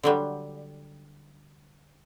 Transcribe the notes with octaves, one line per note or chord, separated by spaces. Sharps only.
D3 F#3 G3